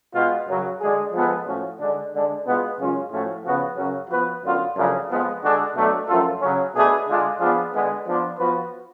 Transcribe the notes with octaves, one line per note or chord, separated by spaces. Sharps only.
B2 G#3 B3 F4
F#2 C#3 F#3
D3 G#3 D4 G#4
F3 G#3 B3 F4 A4
A2 F3 A3 C#4 F#4
D3 G#3 D4
D3 G#3 D4
B2 G#3 B3 F4 G#4
F#2 C#3 G#3 C#4 F4
A2 F3 A3 C#4 F#4
C#3 F3 B3 F#4 B4
F#2 C#3 F#3 C#4
F3 B3 F#4 B4
F#2 D3 F#3 B3 F4
F#2 C#3 F3 A3 D4
F2 F3 G#3 B3
D3 G#3 D4 F#4 A4
B2 F#3 A3 D4
F#2 F3 A3 F4 A4
C#3 F#3 C#4
B2 A3 D4 G#4 B4
D3 G#3 D4 F4
F3 B3 D4 F4 G#4
D3 G#3 B3
F3 B3 D4 F4
F3 B3 F#4 B4